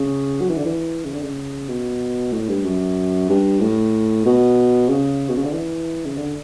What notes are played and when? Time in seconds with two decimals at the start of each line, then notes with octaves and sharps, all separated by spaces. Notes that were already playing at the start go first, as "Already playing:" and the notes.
Already playing: C#3
0.41 F#3
0.49 E3
0.58 D3
0.65 E3
1.05 C#3
1.13 D3
1.22 C#3
1.69 B2
2.32 A2
2.49 G2
2.65 F#2
3.29 G2
3.61 A2
4.25 B2
4.88 C#3
5.29 B2
5.36 C#3
5.45 D3
5.53 E3
6.05 C#3
6.17 D3